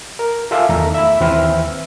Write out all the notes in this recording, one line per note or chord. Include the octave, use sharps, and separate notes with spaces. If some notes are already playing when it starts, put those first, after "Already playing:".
A#4
F4 A4 E5 F5 G#5 D6
E2 D#3 A3 A#5
E5 B5
D#2 E3 C4 B4 E5 F6